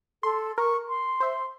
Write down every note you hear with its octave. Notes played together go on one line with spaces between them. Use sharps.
A4 C6
A#4 C#6
C6
C5 E5